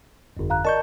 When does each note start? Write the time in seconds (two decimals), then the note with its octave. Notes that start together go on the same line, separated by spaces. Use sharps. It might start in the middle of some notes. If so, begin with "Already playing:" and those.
0.37 G1 F2
0.50 F5 A#5 F#6
0.65 A#4 D5 D#5 A5 C#6 G6